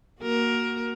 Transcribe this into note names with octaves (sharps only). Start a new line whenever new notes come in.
A#3 F#4 A#4